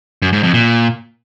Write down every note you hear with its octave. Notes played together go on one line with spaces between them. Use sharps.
F#2
G#2
F2
A#2